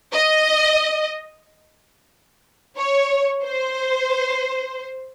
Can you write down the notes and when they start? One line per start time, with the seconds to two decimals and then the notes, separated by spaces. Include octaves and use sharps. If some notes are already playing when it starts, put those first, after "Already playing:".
0.13 D#5
2.77 C#5
3.43 C5